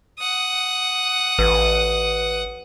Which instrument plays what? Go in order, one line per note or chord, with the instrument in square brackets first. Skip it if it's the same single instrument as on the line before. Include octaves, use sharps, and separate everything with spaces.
[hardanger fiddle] F#5 D#6
[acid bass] A1 [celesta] B4